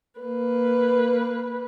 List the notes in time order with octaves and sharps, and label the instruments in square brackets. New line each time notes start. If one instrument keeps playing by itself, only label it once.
[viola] A#3 B4